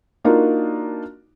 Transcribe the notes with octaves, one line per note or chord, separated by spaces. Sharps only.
A#3 D4 D#4 F4 F#4 A#4